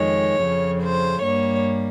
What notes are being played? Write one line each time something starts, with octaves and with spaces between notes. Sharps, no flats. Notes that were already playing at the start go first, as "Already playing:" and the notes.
Already playing: F2 D#3 G#3 C#5
F2 C#3 F3
C5
G2 G3 A#3 C#5